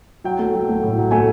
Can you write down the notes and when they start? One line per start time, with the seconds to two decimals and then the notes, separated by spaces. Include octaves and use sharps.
0.24 F#3 G5
0.39 A3
0.54 F#3
0.69 A3
0.83 A2
0.98 F#3
1.11 A3 G#5